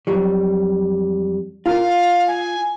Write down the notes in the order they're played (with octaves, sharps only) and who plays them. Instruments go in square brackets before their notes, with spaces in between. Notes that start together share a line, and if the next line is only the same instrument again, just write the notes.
[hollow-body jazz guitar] F2 F#3 G3
[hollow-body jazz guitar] F4 A#4 [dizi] F5
[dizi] G#5